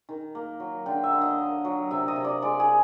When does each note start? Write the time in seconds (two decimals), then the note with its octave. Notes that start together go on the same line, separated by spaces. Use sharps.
0.09 D#3
0.35 A#3
0.60 F#3
0.86 D3 G5
1.04 E5
1.12 D3
1.21 D#5
1.38 A#3
1.65 F#3
1.91 C3 E5
2.08 D#5
2.16 C3
2.24 D5
2.42 G#3 D5
2.60 G#4